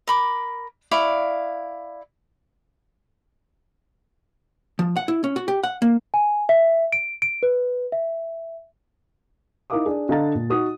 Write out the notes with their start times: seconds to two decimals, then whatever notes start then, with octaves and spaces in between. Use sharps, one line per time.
0.07 A#4 B5 D6
0.91 E4 D5 F5 C#6
4.79 F3
4.96 F#5
5.08 E4
5.24 C#4
5.36 F#4
5.48 G4
5.63 F#5
5.82 A#3
6.14 G#5
6.49 E5
6.92 D7
7.22 D7
7.43 B4
7.92 E5
9.70 D#4 E4 A#4 F5 D6 D#6
9.86 D4 G#4
10.09 D3 D#5 F5 A#5 A6
10.35 A#2
10.49 D#4 F#4 D#6